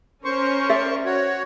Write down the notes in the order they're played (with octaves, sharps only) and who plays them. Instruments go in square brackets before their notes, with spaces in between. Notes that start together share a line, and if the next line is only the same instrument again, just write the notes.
[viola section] C#4 A#4 [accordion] C5 C#6
[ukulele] D5 E5
[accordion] F#4 C#5